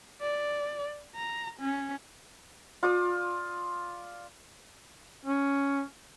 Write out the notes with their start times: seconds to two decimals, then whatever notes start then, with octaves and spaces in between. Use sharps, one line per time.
0.21 D5
1.15 A#5
1.59 C#4
2.83 F4 D5 D#6
5.25 C#4